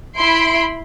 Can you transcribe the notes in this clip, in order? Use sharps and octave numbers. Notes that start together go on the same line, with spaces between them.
E4 B5 C6 D7